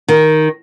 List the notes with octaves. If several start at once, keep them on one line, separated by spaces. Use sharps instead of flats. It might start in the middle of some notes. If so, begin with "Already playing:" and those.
D#3